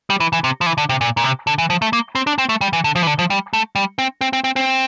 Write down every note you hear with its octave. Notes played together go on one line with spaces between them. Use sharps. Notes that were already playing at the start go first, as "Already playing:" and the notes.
G3
E3
E3
C3
F3
E3
D3
C3
A#2
A#2
C3
D3
E3
F3
A3
A#3
C4
D4
C4
A3
G3
E3
D3
F3
E3
D3
F3
G3
A3
G3
C4
C4
C4
C4
C4